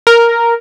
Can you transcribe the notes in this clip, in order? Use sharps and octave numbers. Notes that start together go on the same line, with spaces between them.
A#4